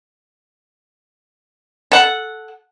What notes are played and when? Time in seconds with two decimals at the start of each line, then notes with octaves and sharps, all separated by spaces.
1.92 A4 F#5